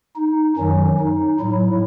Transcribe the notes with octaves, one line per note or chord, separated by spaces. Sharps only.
D#4
F#2 D#3 F#3 C#4
D#4
A2 F#3 E4